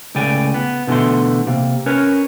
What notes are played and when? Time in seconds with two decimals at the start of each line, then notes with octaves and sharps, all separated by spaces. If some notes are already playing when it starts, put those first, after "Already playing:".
0.15 C#2 A2 C#3 D5 G5 G#5
0.54 B3
0.87 B2 D3 E3 A3 C6
1.47 C3 A#3
1.86 C#4 A#4 B4 C#5